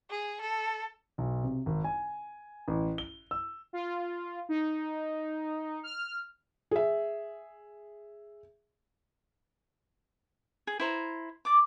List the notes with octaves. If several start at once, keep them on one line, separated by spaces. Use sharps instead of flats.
G#4
A4
B1
C3
G#1
G#5
A1
G7
E6
F4
D#4
F6
G#4 E5
G#4
E4 C5 A#5
D5 D6